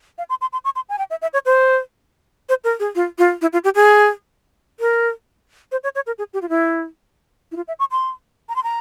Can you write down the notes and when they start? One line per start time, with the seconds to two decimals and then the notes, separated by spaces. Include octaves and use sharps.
0.18 F5
0.29 C6
0.41 C6
0.53 C6
0.64 C#6
0.76 C6
0.89 G#5
0.98 G5
1.10 E5
1.22 E5
1.33 C#5
1.45 C5
2.49 C5
2.64 A#4
2.80 G#4
2.95 F4
3.18 F4
3.41 E4
3.53 F4
3.64 G4
3.75 G#4
4.80 A#4
5.72 C5
5.83 C#5
5.95 C#5
6.06 A#4
6.18 G#4
6.33 G4
6.42 F4
6.49 E4
7.52 E4
7.56 F4
7.68 E5
7.79 C#6
7.91 C6
8.49 A#5
8.56 C6
8.63 A#5